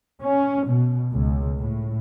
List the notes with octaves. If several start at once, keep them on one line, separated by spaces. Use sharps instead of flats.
C#4
B2
C#2
A2